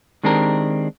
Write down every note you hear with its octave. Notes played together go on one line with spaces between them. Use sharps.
D#3 G#3 C4 D4 G4 A#4